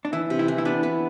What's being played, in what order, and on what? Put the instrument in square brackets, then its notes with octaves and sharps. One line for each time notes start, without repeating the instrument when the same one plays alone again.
[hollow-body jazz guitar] D4
[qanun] E3 [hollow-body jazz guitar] E4
[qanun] C3
[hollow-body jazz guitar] E4
[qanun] E3
[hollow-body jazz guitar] E4
[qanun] B3 [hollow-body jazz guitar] D4
[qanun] B3